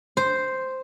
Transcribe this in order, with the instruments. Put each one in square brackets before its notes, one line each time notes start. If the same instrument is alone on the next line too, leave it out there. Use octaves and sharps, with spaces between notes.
[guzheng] C5